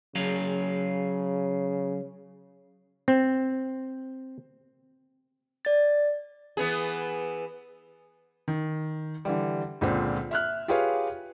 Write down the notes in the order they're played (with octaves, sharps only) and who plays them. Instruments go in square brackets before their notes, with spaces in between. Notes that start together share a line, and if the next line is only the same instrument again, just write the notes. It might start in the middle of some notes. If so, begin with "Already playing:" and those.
[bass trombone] C#3 [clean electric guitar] F#3 G#4 F5
[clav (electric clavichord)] C4
[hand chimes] D5 A6
[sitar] E3 B3 G#4
[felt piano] D#3
D3 E3 G3
C#2 A#2 D3 C4
E5 F6 F#6
F4 G4 G#4 B4 C#5 F5